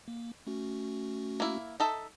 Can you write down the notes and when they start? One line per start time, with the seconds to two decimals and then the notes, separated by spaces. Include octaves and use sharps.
0.08 A#3
0.47 A3 C#4 F#4
1.40 A#3 E4
1.80 D#4 A4 E5